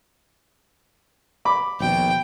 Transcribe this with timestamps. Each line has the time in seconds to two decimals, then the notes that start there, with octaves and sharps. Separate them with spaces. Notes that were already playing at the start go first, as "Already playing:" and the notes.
1.45 B5 D6
1.80 A#1 D#2 B2 G5